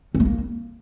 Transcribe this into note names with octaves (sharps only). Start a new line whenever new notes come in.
C#4
A3
A#3